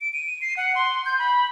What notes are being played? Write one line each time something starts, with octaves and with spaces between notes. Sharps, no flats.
D7
D#7
C7
F#5
C6
G6
B5